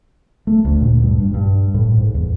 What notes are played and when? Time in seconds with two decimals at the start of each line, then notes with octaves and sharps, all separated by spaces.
0.47 A3
0.65 D2
0.81 A#2
1.02 G2
1.19 G2
1.34 G2
1.74 A2
1.98 G#2
2.14 E2